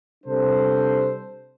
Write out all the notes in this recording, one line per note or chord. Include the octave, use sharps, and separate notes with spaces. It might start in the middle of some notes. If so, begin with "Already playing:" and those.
C3 G3 D4 A4 C5